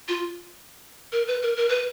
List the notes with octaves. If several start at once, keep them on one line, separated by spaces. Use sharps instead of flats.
F4
A#4
B4
A#4
A#4
B4